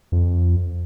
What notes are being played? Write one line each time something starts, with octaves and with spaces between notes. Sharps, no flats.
F2